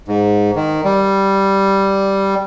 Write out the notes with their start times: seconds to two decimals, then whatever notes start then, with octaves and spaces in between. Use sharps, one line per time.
0.08 G#2
0.56 D#3
0.84 G3